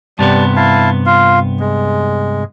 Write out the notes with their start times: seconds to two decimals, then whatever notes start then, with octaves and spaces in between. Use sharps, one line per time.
0.19 G2 C3 G3 B3 A5
0.56 E4 F5 A5
1.06 F4 F5
1.60 G#3